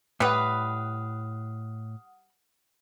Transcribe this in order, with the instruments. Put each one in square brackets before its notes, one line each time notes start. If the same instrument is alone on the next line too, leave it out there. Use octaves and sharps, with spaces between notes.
[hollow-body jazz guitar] A2 [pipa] G3 B4 [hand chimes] F#5 D#6 F6